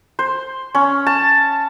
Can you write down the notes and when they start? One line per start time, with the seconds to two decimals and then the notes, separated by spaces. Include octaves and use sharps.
0.19 C5
0.75 C#4
1.07 A5